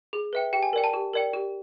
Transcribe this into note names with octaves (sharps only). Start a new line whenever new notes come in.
G#4
B4 E5 G5
G4 G5
G#5
A#4 D5 G5
A5
G4
A#4 D5 G5
G4